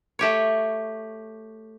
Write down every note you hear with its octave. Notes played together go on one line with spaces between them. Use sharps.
A3 G4 C#5